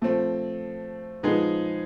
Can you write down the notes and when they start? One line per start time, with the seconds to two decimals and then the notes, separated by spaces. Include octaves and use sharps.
0.02 F3 A3 C4
1.23 F3 G#3 B3 D#4 G#4